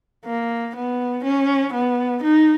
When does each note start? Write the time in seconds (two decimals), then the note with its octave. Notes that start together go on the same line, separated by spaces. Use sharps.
0.25 A#3
0.76 B3
1.24 C#4
1.73 B3
2.23 D#4